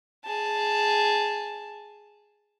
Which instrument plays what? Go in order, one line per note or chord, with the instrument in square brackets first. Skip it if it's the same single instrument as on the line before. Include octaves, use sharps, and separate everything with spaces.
[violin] G#4 A5